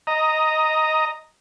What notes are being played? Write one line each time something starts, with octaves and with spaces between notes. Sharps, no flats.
D#5 A#5